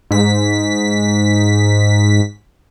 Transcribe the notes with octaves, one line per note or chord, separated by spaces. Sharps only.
G#2 B6